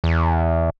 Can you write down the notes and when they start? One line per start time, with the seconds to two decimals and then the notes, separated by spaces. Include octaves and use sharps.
0.04 E2